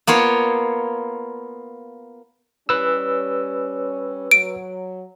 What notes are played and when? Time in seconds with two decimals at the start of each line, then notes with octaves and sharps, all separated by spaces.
0.07 A#3 B3 F4 C#5
2.69 G3 C#4 B4 E6
4.31 F#3 D7